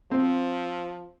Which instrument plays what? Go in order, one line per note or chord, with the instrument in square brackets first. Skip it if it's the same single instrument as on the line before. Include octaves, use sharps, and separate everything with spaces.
[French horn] F3 [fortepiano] C4